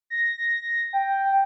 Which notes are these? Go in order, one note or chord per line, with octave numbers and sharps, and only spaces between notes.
A#6
G5